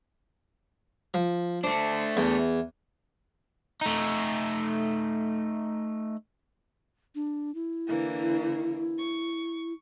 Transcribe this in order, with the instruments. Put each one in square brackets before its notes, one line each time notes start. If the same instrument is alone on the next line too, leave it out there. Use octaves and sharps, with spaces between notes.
[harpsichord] F3
[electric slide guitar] A3 D4 [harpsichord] C5
[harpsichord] E2
[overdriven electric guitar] A3 D#4
[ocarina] D4
E4
[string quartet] D3 E3 A#3
C#6